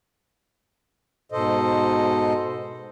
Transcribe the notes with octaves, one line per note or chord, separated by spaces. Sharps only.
G#2 B2 A4 C5 D#5